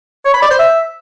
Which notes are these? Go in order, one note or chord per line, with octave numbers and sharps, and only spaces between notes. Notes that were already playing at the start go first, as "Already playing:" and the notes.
C#5
B5
D5
C5
E5